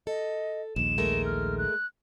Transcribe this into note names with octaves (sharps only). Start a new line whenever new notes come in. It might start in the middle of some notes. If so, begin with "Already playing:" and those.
A4 D#5
A#1 D#2 G#3 E7
G#3 A3 A#4
F6
F#6